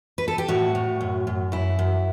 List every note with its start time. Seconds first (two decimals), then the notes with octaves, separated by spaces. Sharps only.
0.18 B4
0.28 A4
0.38 G4
0.48 A2 F#4
0.75 A2
1.01 F#2
1.27 F#2
1.52 F#2 E4
1.79 F#2